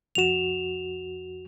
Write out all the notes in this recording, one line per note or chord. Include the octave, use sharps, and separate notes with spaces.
C2 F2 F#4 E7 F7